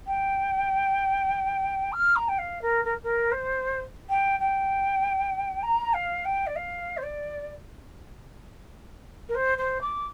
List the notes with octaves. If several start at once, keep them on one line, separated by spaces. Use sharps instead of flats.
G5
F6
A#5
G5
F5
A#4
A#4
A#4
C5
G5
G5
A#5
F5
G5
D5
F5
C5
D5
A#4
C5
C5
D6